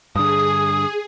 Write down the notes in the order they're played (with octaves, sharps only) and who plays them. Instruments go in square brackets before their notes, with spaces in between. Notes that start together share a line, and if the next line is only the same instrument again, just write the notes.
[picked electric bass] G2 D3 [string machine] G#4 [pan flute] D#6